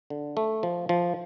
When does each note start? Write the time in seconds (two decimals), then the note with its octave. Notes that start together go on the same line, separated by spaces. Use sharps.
0.10 D3
0.37 A3
0.63 F3
0.89 F3